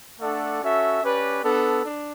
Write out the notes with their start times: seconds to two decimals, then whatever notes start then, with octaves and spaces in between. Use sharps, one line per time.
0.20 A3 D4 A4 D5 F#5
0.62 C#4 F#4 A4 E5
1.02 C#4 G4 B4 D5
1.43 B3 D4 A4
1.84 D4